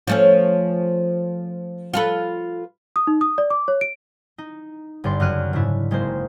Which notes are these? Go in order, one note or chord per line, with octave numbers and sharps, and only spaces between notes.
F3 A3 C#4
F4 A4 B4
D#6
D#4
D#6
D5
D6
C#5
D7
D#4
G1 G2 D5 C6
F#2 C#3 F6 F#6 D#7
G#2 C#3 D4 E4
F#1 G#3 A#3 C5